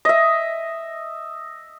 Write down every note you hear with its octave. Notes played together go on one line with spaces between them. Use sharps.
D#5 E5